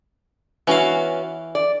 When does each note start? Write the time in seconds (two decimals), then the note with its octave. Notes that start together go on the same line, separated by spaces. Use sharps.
0.67 E3 B3 C#4 F#4 F5
1.55 D5